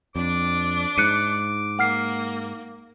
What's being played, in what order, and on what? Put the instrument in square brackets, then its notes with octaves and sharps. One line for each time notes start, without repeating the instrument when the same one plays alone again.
[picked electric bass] F2 [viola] D4 [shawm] D6
[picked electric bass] G#2 [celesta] F#6 C#7 D#7
[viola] A#3 [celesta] F#5 F6 C7